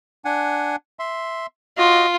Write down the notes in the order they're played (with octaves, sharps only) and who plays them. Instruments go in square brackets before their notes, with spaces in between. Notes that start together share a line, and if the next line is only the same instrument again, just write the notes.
[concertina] D4 F#5 G#5
E5 C6
[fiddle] F4 [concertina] F#4 D#5